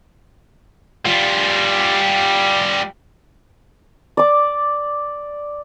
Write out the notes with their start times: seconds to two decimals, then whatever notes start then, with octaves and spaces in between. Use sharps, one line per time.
1.06 G3 F4
4.17 D5 D6